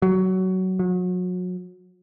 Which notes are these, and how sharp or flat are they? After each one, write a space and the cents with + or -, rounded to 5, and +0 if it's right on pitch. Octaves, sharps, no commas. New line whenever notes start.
F#3 +15
F#3 -35